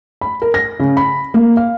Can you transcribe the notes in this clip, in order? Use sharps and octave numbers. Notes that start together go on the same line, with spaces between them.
B5
A#4
A#6
C#3
B5
A#3
F5